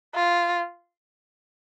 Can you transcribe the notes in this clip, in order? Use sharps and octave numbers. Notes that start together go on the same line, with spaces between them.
F4